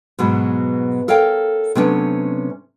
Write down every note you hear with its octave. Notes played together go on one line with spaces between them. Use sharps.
G#2 B2 F#3
A4 A#4 C#5 F5 G5
C3 F#3 A3 B3 C#4 D4